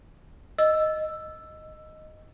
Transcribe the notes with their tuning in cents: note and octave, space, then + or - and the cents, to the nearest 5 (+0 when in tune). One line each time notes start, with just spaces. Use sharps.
D#5 +0 E6 +10